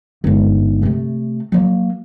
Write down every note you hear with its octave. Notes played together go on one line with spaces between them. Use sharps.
G1 G#2
C3 A3
F#3 A#3